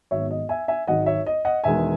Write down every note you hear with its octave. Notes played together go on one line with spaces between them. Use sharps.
G#1 G#2 F#3 B3 C#5 E5
D#5
E5 G#5
E5 G#5
G#1 G#2 F#3 D#5 F#5
C#5 E5
D#5
D#5 F#5
E1 E2 D#3 G#3 E5 G#5